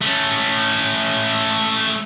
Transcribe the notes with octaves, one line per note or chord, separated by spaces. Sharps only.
A3 C#4